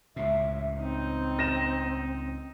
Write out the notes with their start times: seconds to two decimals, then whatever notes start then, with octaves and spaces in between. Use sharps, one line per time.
0.16 C#2 A2 E5
0.79 C4 D#4
1.39 A#6 E7